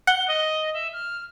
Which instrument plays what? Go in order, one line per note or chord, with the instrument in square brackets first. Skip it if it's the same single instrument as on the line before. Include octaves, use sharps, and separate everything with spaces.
[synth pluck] F#5 [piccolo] G7
[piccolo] D#5
E5
F6